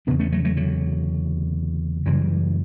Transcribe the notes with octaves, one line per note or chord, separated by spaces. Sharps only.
E2 C#3 B3 D4
A3 C#4
F#3 A3
F#3 A3
D3 F#3
F#2 C#3 E3 G3